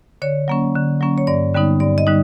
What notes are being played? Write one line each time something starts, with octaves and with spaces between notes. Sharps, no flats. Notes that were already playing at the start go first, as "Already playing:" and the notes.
D3 C#5
F#3 A#3 C#4
D3
F#3 A#3 C#4
C#5
G2 D5
D3 G3 B3 D#4
G2 D5
D#5
D3 G3 D#4